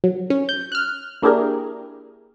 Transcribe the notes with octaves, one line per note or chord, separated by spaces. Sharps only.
F#3
C#4
G6
F6 F#6
A#3 D4 E4 G4 G#4 A#4